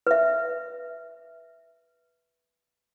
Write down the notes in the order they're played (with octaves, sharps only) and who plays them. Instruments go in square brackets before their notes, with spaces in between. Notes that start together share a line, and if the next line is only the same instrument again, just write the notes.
[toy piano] B4 E5